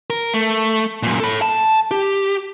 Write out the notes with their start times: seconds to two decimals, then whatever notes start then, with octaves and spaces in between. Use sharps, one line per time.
0.10 A#4
0.34 A3
1.03 F#2 A#2
1.20 A4 B5
1.42 A5
1.91 G4